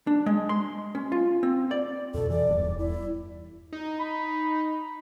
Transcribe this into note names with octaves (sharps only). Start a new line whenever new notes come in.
D4
G#3
C6
C#4
F4
C4
D5
F2 B2 A4
E3 D5
D#1 E2 G2
E4
D#4
B5